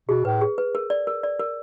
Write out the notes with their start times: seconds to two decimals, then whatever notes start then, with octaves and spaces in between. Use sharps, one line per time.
0.09 B2 G#4
0.25 A2 B4
0.41 G#4
0.58 B4
0.75 A#4
0.90 D5
1.07 A#4
1.23 D5
1.39 A#4